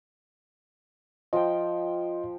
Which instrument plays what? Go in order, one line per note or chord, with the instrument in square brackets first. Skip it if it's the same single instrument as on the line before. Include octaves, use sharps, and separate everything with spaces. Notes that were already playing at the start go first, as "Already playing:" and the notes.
[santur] F3 G5 [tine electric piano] D#5